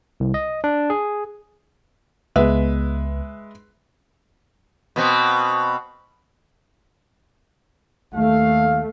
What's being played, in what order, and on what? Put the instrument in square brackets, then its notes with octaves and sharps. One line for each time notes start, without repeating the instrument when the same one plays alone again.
[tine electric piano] C2
D#5
D4
G#4
[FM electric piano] C#2 B3 [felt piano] G#3 B4 E5
[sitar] B2 B3 C4
[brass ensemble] D#2 F5 [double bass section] A3